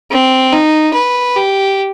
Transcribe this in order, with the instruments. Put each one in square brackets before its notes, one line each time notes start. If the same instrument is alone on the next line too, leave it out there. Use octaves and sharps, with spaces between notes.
[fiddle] C4
D#4
B4
G4